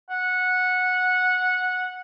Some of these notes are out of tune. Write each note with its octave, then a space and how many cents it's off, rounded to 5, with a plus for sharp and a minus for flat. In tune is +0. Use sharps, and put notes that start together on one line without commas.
F#5 -15